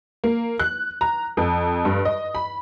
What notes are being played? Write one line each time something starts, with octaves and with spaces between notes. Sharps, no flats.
A#3
F#6
A#5
F2
G2
D#5
B5